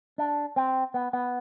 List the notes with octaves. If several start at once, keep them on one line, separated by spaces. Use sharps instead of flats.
D4
C4
B3
B3